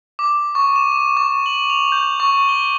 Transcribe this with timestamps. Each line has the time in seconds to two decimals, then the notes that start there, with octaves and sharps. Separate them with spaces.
0.19 D6
0.55 C#6
0.76 E7
0.92 E7
1.17 C#6
1.46 F#7
1.70 F7
1.92 G6
2.20 C#6
2.49 G7